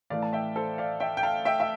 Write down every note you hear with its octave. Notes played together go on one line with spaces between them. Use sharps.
A2 E3 A3 D5 F5
A5
E5 G5
A4 C5
D5 F5
E5 G5
G5
F5 A5
E5 G5
E5